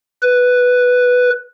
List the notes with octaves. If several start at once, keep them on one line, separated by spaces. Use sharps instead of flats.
B4